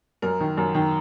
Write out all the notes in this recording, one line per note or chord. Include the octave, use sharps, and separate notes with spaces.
F#2 A#4
D#3
F#2 A#4
D#3